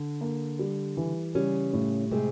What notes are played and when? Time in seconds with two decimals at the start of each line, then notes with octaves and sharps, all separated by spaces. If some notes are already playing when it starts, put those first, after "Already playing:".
Already playing: D3
0.21 A#3
0.59 G3
0.97 E3
1.35 C#3 G3 C#4
1.73 A2
2.11 C3 G#3 C4